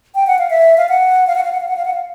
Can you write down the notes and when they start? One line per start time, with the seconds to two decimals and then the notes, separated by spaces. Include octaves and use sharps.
0.15 G5
0.27 F#5
0.38 F5
0.50 E5
0.77 F5
0.89 F#5
1.27 F5
1.35 F#5
1.43 F5
1.52 F#5
1.60 F5
1.68 F#5
1.76 F5
1.85 F#5
1.93 F5